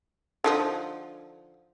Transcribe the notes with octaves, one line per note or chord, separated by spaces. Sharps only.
D3 F3 D#4